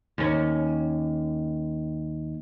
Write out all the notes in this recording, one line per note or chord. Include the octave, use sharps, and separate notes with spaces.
D#2 C#4